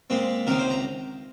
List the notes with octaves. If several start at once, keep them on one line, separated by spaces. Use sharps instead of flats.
A#2 G#3 C4
C#2 C3 D#3 G#3 A#4
C5
A#5